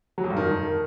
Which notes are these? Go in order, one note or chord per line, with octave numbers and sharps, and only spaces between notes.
F#3
F2
G2
D#3